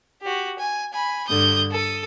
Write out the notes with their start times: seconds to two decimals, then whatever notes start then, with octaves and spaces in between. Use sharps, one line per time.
0.21 F#4 G4
0.58 G#5
0.92 G#5 B5
1.28 G2 D3 D#6 G6
1.71 A4 D#6